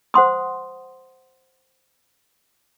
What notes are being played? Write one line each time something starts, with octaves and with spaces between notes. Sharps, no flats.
C5 F#5 C6 D#6